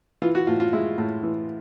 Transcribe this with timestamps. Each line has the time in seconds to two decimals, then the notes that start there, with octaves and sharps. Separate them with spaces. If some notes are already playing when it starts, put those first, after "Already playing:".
0.22 E3 F4
0.35 F#4
0.47 A2 F4
0.60 F4
0.73 G#3 E4
0.98 A2
1.23 E3